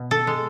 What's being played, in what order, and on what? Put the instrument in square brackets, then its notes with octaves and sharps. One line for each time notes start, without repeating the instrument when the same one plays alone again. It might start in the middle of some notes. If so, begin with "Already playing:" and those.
Already playing: [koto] B2
A4
G#3